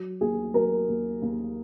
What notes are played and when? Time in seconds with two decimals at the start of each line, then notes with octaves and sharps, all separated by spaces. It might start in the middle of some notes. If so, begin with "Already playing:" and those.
Already playing: F#3
0.21 D#2 G#4
0.54 F#3 A#4
0.88 D#2
1.22 D#2